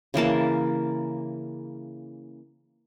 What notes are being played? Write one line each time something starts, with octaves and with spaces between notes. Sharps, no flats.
C#3 E3 A#3 A5